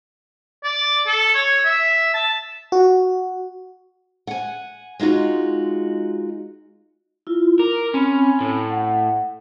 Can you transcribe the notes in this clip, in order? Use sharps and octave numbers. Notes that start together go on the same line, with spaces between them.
D5
A4
C#5
E5
A5
F#4
F#5 G#5
G#3 D#4 F4 F#4
E4 F4
A#4 D6
C4 C#4 G#5 B5
A2
F#5